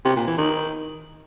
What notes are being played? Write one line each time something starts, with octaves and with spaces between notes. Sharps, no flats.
C3
A#2
E3
D#3